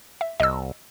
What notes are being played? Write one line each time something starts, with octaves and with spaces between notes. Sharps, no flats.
E5
C2 D#5 E6